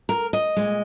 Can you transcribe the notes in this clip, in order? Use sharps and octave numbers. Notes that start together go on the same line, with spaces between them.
A#4
D#5
A#2 G#3